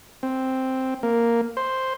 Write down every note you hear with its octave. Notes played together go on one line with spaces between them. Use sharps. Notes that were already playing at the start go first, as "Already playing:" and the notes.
C4
A#3
C5